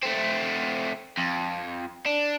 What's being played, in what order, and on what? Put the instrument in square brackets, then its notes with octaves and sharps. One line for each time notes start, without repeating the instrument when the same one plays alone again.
[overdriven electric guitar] A3 C4
F2
D4